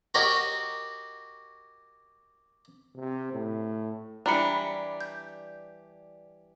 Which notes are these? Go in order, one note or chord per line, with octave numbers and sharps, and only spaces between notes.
F#4 G4 A#4 C#5 D#5 G5
C3
A2
E3 G3 D4 A#5 B5 C#7
G6